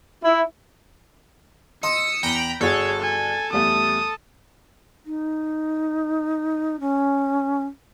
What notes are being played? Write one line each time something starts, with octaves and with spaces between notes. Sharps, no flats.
E4
D#5 C6 D#6 E6 C#7
E2 G5 A#5 B5
G1 F#4 G#4 A4 C#5
G#5
E2 G3 A3 D#6
D#4
C#4